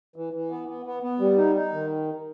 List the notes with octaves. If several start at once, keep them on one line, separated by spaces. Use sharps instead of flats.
E3
E3
B3
B3
B3
B3
G3
D#4
D#4
D#3